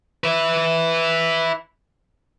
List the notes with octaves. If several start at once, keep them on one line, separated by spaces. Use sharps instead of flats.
B4 E5